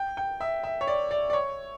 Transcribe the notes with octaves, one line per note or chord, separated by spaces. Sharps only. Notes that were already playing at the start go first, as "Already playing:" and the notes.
Already playing: G5
G5
E5
E5
C#5
D5
D5
D5
C#5